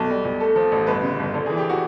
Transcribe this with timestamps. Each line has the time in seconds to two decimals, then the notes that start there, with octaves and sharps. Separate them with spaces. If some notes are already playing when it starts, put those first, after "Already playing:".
Already playing: B1 A4
0.10 G3
0.25 B1
0.40 A3 A4
0.56 F3
0.72 A1
0.87 G1 B4
1.03 C#3
1.19 G1
1.34 A#1 A4
1.46 G#4
1.50 E3
1.57 G4
1.69 F#4